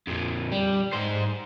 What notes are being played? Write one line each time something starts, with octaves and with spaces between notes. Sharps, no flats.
F2 A#2
G3
G#2 C5